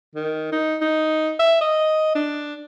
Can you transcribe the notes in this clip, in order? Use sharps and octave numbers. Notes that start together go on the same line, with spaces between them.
D#3
D#4
D#4
E5
D#5
D4